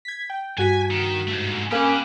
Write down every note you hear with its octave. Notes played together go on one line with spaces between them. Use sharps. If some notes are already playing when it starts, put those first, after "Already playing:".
G#6 B6
G5
G2 F#4 G#5 B6
D#3
G#2 A3
A#3 C#4 G4 B4 B5 D#6